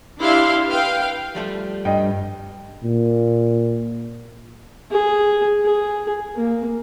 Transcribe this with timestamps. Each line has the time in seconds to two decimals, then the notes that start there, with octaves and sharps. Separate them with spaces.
0.20 D4 E4 G4 E5 F5 C6
0.70 B4 F5 G5
1.35 F3 G3 A3
1.85 G2 D#5 G5
2.84 A#2
4.91 G#4
5.65 G#4
6.36 A#3